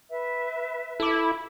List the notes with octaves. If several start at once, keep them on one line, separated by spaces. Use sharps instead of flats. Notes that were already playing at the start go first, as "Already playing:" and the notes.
B4 E5
E4 A4 D6